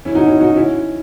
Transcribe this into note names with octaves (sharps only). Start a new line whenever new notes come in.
C#4 E4
D#4 F#4
C#4 E4
D#4 F#4
C#4 E4